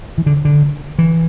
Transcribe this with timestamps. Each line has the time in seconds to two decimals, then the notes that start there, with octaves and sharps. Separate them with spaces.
0.18 E3
0.26 D3
0.45 D3
0.99 E3